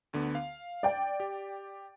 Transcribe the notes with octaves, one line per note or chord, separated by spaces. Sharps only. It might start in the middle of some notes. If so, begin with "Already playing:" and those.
D2 D3 B3
F5
D5 G5
G4